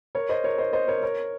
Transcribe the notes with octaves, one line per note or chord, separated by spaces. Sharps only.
A#4 C#5
C5 D#5
A#4 C#5
C5 D#5
C5 D#5
A#4 C#5
A#4 C#5